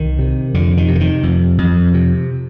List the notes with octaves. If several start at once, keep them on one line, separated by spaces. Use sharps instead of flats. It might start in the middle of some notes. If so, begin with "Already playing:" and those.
Already playing: C2 D#3
C3
F2 D3
D#3
C3
D3
D#3
F2
F2
C3